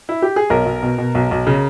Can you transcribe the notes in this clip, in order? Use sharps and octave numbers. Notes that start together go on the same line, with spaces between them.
E4
G4
G#4
B1 A#4
B1
B2
B2
B1
B1
C#3